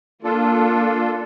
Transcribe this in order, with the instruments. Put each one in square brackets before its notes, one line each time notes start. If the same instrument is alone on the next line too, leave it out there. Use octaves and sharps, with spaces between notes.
[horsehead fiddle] A#3 [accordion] D4 F4 A4